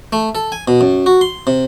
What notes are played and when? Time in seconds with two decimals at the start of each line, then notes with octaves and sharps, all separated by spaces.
0.12 A3
0.35 A4
0.52 G#5
0.68 B2
0.81 F#2
1.06 F#4
1.21 C6
1.47 C3